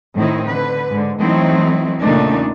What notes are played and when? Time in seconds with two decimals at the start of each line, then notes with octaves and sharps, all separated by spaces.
0.17 A2 D#3 C4 D#4 E4
0.47 D3 B4
0.90 G#2 D3
1.20 E3 F#3 A3 C4 D#4 E4
2.03 E2 A#2 C#3 A3 D4 D#4